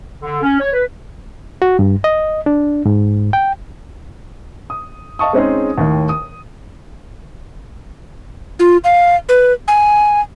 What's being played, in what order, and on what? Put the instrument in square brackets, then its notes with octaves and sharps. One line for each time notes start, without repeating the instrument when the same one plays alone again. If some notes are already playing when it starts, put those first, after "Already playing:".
[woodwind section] D3
C#4
C#5
B4
[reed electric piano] F#4
G2
D#5
D4
G#2
G5
[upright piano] D#6
D#5 F5 A5 C#6 D#6
G#3 C4 C#4 D#4 G#4
D#2 A2 D#3
D#6
[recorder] F4
F5
B4
G#5